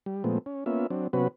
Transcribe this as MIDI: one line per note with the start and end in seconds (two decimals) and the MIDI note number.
0.06 0.23 55
0.24 0.38 46
0.24 0.38 53
0.24 0.38 56
0.24 0.38 57
0.24 0.38 59
0.24 0.38 60
0.46 0.64 61
0.66 0.87 58
0.66 0.87 59
0.66 0.87 61
0.66 0.87 65
0.66 0.87 76
0.90 1.07 54
0.90 1.07 60
0.90 1.07 62
1.13 1.28 48
1.13 1.28 54
1.13 1.28 59
1.13 1.28 61
1.13 1.28 66
1.13 1.28 71